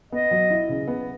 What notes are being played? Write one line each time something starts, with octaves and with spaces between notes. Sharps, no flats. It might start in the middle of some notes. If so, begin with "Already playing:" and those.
B3 D#5
F#3
E4
C#3
B3